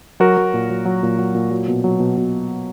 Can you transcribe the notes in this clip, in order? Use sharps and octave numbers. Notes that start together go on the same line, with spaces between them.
F#3 F#4 A#4
F#3
A#2
F#3
F#3
A#2
F#3
A#2
F#3
B2
F#3
B2
B2